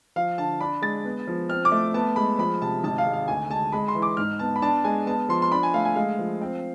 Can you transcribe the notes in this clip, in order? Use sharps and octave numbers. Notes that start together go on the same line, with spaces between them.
F3 F5
D3 A5
D4 B5
G#3 A6
B3
F3
C4 F6
D6
A3
B3 A5
G#3 B5
F3 B5
C3 A5
G#1 A5
F5
G#3
F5
D2 G#5
G#3 A5
G#3 B5
C6
E3
D6
G#2 F6
B3 A5
B5
D4 A5
G#3 G#5
B3 A5
F3 C6
C6
D4 B5
G#5
A3 F5
G#5
G#3 F5
F3
C4